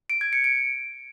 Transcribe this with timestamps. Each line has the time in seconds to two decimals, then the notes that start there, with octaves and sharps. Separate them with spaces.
0.10 D7
0.21 G#6
0.33 C#7
0.44 D7